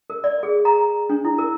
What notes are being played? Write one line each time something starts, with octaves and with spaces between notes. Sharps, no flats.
A#4
D5
G#4
A#5
D4
E4
A#4